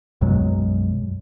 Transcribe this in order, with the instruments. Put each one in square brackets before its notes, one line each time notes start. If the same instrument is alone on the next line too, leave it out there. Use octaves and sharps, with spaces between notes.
[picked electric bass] B1 F#2 F#3 G#3